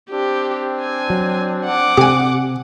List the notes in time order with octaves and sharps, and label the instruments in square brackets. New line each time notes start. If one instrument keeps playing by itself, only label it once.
[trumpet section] C4 D4 [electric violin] G4
[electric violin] G#5
[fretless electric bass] F#3
[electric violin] F#5 D6
[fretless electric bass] C3 [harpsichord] G4 G#5